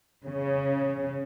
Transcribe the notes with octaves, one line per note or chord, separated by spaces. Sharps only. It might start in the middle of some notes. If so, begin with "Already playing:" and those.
C#3